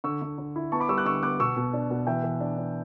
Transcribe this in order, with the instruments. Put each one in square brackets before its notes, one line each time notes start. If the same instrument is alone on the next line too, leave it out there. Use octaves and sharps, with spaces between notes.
[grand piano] D3 C#6 E6
D3
D3
E4
B3 A5 C#6
B5 D6
G3 C#6 E6
D6 F#6
D3 C#6 E6
B3 D6 F#6
B2 C#6 E6
B2
D4
B2
E3 E5 G5
E3
D4
D4